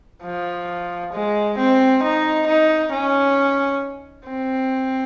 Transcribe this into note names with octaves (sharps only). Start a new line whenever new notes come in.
F3
G#3
C4
D#4
D#4
C#4
C4